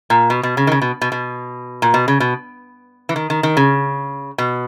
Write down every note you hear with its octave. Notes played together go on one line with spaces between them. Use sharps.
A#2
B2
B2
C#3
D#3
C#3
B2
B2
B2
A#2
B2
C#3
B2
E3
D#3
D#3
D#3
C#3
B2